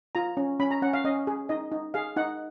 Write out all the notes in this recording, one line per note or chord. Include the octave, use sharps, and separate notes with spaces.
F4 A#5
C#4
C#4 B5
A#5
C#4 F#5
F5
C#4 D#5
G#4
D#4 D#5
D#4
G#4 F5
D#4 F#5